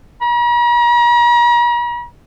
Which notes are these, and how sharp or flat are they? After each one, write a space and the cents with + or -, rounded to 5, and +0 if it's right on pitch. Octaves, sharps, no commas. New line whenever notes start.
A#5 +45